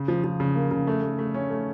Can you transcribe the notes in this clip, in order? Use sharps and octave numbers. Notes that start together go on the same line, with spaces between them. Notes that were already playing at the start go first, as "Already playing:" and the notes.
Already playing: C#3
F3
F3
C#3
A#3
C#3
A3
A3
A3
C#4
A3